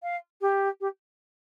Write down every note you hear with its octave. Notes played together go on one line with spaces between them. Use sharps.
F5
G4
G4